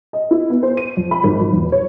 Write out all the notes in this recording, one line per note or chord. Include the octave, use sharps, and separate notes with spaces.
D#5
E4
B3
C5
D#7
F2
B5
G#1
F3
E2
C#5